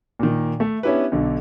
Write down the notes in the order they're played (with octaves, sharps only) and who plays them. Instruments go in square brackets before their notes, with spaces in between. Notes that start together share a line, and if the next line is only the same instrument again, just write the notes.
[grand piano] A#2 D#3
A3
B3 C#4 D4 E4 G4 B4
B1 D3